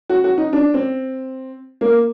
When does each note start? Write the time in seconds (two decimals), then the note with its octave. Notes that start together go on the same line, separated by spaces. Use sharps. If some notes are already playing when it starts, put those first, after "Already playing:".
0.10 F#4
0.24 F#4
0.38 D#4
0.53 D4
0.74 C4
1.81 A#3